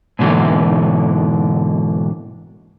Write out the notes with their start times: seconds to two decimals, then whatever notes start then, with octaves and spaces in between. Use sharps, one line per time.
0.19 G#2 B2 D3 E3 A#3